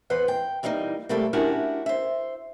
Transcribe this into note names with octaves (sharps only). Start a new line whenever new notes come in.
E2 B4 C5 F#5
G5
E3 G3 A#3 D4 D#4
C3 G3 A3 A#3 G4 A4
C#4 D4 E4 F#4 G4 A#4
C5 E5